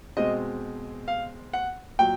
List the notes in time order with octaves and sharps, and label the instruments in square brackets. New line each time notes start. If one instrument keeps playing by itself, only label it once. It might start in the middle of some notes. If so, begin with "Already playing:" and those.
[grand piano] B2 G#3 C4 D#5
F5
F#5
A#2 F#3 G5